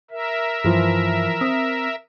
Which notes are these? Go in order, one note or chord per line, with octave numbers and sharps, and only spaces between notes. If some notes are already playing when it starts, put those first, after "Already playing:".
A#4 E5
G2 E3 F3
C4 D#6